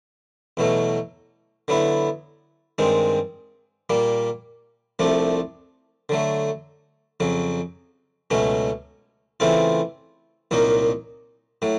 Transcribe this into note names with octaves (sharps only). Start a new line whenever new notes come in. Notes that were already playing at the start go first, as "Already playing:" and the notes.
E2 B2 F#3 A3
D3 F#3 B3 E4
G2 D#3 G#3 C4
A#2 G3 A#3
C2 C3 F3 A3 D4
D3 F#3 A3
F2 C#3 F#3
C#2 B2 F#3 A3 C#4
C#3 E3 A3 C4 F4
C2 A#2 F#3 A#3 D#4
A2 F#3